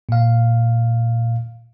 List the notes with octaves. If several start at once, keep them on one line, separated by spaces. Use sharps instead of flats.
A#2 F5